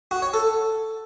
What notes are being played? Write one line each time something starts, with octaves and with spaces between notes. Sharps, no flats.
F#4
C#5
A4